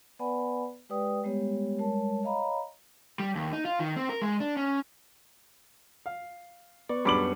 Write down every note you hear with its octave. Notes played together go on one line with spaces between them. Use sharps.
B3 B4 D5 F#5 G#5 B5
G#3 G4 B4 D5 G5 D#6
G3 G#3 B3 G4 C#5
G3 G#3 A#4 C#5 A5
C#5 D#5 F5 A#5 B5
G3
D#2
D#4
F4
D#3
C4
A#4
G#3
D4
C#4
F5
B3 B4 D5 C#6
F#2 G3 D4 B5 D6 F#7